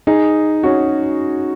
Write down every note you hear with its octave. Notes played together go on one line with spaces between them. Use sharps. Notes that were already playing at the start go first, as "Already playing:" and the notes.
D#4 G#4
C#4 F#4